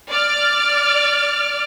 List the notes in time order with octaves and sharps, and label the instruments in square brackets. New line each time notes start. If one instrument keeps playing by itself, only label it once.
[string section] D5 F6